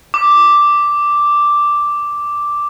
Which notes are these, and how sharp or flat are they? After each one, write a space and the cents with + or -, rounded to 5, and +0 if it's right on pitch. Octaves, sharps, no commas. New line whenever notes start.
D6 +0